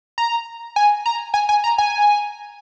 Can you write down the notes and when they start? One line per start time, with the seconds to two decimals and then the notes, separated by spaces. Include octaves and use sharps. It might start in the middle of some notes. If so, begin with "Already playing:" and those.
0.18 A#5
0.76 G#5
1.06 A#5
1.34 G#5
1.49 G#5
1.64 A#5
1.78 G#5